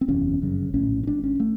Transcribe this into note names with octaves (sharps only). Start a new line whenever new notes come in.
C4
F#1 E2 C3 C#4
G1 F#2 C#3
A#1 A2 C#4
C#4
G#1 G#2 D4
C#4
A3